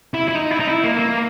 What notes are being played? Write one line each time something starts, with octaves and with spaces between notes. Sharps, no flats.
E4
E4
D#4
E4
D#4
E4
A#3
A#3